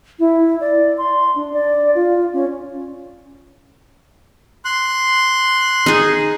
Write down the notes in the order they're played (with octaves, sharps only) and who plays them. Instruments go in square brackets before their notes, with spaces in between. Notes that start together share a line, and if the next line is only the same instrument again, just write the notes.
[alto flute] E4
D5
C6
D4
D5
F4
C#4
[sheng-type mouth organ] C6 F#6
[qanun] D#4 G#4